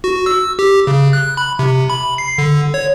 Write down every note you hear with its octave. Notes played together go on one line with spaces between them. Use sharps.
F#4
E6
G4
C#3
F#6
B5
C3
B5
C7
D3
C#5